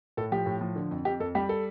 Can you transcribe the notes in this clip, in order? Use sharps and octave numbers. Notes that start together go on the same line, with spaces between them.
A2 A4
F3 G4
A2
F3
D3
F2
F2 G4
F2 A4
G3 G4
A4